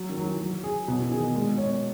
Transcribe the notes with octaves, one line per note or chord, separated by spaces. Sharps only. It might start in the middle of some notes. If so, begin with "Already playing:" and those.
Already playing: F#3
D#3
F#3
E3
F#3
G#4
B2 F#3
E3
D#3 G#4
B2
A#2 G#3
B2
C#5
B2